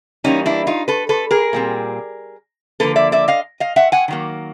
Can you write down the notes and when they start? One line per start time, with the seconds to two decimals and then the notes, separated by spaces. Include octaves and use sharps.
0.24 E3 G3 A#3 C#4 D#4
0.46 D4 E4
0.67 D#4 F4
0.88 A4 B4
1.09 A4 B4
1.31 G#4 A#4
1.53 A#2 G3 C4
2.80 D3 F3 A#3 A4 B4
2.96 D5 E5
3.12 D5 E5
3.28 D#5 F5
3.60 D#5 F5
3.76 E5 F#5
3.92 F#5 G#5
4.08 D#3 F#3 A#3